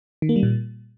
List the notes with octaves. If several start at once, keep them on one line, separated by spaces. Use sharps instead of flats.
D#3
A#3
G3
A#2